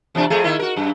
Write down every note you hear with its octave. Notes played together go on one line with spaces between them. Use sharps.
E2 C3 D4
F2 A3 G#4
D#3 A#3 E4
F#4 A#4
F#2